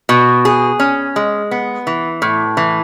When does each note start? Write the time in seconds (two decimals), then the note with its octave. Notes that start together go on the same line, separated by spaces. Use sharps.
0.09 B2
0.45 G#4
0.80 C#4
1.16 G#3
1.51 B3
1.87 E3
2.22 A2
2.57 E3